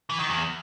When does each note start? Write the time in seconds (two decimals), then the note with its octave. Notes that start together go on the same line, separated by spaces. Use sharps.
0.10 E3
0.19 D#3
0.29 E2